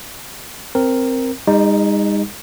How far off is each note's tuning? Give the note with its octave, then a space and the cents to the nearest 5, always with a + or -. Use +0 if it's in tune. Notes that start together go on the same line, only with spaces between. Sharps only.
C4 +0 A#4 +0
G#3 -45 D#4 +0